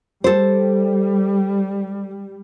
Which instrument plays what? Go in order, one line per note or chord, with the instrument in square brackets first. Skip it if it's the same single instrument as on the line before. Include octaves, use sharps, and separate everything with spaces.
[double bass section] G3 [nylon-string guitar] A4 C5